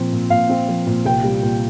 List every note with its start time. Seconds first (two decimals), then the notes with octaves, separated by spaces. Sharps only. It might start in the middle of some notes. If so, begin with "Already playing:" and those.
Already playing: A#2 F3 C4
0.12 A#2
0.30 A#2 F5
0.49 C4
0.69 F3
0.87 A#2
1.05 C2 G5
1.24 G3
1.43 A#2